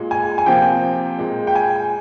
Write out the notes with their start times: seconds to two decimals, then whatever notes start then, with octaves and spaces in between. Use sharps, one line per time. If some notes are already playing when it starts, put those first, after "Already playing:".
Already playing: A#2 G#3
0.11 G#5
0.38 G#5
0.46 C3 F3 A#3 G5
1.19 A#2 G#3
1.47 G5
1.55 G#5